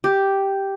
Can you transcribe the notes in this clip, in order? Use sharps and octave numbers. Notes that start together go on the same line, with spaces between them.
G4